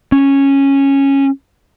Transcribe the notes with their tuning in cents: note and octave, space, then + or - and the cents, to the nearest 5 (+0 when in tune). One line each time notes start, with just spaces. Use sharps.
C#4 -10